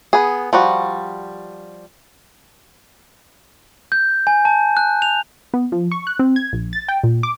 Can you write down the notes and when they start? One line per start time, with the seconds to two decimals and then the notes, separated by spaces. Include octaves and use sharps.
0.13 B3 G#4
0.53 F3 G3 F#4
3.92 G6
4.27 G#5
4.45 A5
4.77 F#6
5.02 F7
5.54 B3
5.72 F3
5.91 C#6
6.07 F#6
6.19 C4
6.36 G#6
6.53 A#1
6.73 A6
6.88 G5
7.03 A#2
7.23 D6